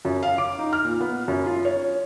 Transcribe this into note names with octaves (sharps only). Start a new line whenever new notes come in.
F#2
F5
D6
D#4
F6
A#2
B3
F#2
F4
C#5